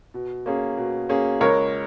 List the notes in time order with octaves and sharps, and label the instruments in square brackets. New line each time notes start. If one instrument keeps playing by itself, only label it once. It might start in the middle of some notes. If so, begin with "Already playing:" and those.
[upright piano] B2
A#3 C#4 G#4
B2
A#3 C#4 G#4
[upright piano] C#2 [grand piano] A#4 C#5